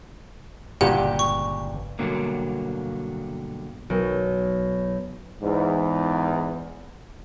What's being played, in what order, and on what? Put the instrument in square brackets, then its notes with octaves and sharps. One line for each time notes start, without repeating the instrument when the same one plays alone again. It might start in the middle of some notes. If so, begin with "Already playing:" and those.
[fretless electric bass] G1 C#3 [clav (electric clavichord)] G2 A#2 G#3 [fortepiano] G4 [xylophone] F#5
[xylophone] C#6
[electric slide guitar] G2 B2 D3 F#3 A#3
[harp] B1
[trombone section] E2 G#2